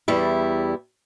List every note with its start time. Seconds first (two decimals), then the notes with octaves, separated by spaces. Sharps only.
0.08 E2 G3 E4